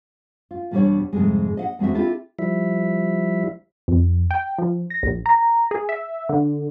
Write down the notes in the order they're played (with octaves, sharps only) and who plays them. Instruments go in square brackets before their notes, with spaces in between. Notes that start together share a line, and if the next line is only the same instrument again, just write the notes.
[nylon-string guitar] F4
E2 B2 G3 A#3 D4 C#5
F2 G#2 C3 G3 G#3
D#5 F5 F#5
E2 G#3 C4 F#4 E5
C4 E4 F4 G4 A4
[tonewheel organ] F3 G3 E4 E5
[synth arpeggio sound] F2
G5
F3
A#6
A#1
A#5
G#4
E5
D3